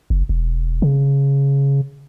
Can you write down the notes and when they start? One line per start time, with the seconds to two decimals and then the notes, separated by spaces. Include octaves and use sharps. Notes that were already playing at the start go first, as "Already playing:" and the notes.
0.10 F#1
0.29 E1
0.82 C#3